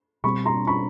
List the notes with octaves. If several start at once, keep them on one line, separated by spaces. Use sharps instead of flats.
B2 G3 C4 B5 C#6
A#5 C6
B5 C#6